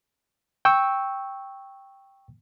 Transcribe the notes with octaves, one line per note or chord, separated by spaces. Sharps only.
G5 C#6 E6